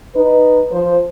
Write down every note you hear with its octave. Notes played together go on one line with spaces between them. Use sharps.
D#4 B4
F3 C5